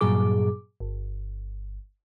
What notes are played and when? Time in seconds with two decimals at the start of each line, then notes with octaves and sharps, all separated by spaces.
0.01 G2 A#2 F#3 G#4 D6
0.80 G1